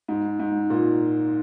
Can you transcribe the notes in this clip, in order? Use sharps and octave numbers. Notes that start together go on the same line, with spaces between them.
G#2
G#2
A#2